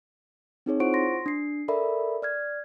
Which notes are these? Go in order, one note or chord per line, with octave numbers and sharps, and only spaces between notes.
C4 D#4 G#4 C#5
E4 F4 C5 F#5 C#6 D7
C6 A#6
D4 C7
A4 A#4 D5 E5 B5
D5 F6 G#6